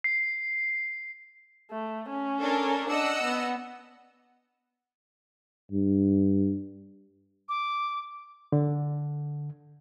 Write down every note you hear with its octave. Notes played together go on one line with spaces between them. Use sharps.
C7
A3
C#4
D4 A4 A#4
D4 D#5 F#5 E6
B3
G2
D6
D3